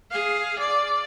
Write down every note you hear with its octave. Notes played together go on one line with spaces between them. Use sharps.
G#4 F5
D5